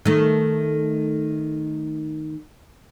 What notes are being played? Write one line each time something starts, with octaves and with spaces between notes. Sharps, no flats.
D#3 A3